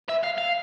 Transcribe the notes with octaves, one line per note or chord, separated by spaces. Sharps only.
E5
F5
F5